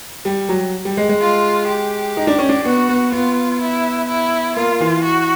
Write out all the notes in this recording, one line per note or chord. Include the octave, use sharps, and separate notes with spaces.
G3
F#3
G3
G#3
G#3
F4
G4
D#4
D4
C#4
D4
B3 F#4
B3
B3 F4
E4
E4
A#3 F4
E3
F#4